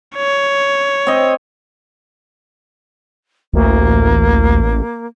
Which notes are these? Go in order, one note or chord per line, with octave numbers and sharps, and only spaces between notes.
C#5
C4 D#5
A1 D2 A#3